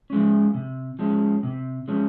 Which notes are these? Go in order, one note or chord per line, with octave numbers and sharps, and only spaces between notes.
F3 G#3 C#4
C3
F3 G#3 C#4
C3
F3 G#3 C#4